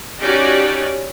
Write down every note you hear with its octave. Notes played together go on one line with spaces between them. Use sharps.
C#4 D#4 F#4 G4 C#5 D5